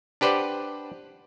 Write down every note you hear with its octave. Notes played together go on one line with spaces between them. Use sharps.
D4 G4 B4 C5 D5 F#5